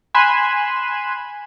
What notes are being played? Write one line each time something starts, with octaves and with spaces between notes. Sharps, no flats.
G#5 B5 C6 F#6 D#7 E7